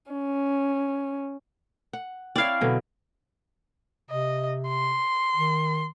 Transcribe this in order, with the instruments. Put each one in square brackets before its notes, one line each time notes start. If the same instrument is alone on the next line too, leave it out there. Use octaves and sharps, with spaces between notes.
[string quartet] C#4
[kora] F#5
[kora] C4 E4 C#5 [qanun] D5 F5
[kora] B2 D3 F#3
[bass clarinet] C3 [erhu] D#5
[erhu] C6
[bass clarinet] D#3